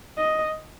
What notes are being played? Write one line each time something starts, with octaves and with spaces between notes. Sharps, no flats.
D#5